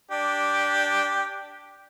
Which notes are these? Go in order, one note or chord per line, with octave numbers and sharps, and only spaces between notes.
D4 G4